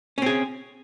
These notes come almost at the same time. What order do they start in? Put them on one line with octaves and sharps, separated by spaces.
C#4 C4 G#4